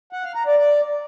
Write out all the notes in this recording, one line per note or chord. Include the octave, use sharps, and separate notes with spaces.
F#5
F5
A#5
D5
D5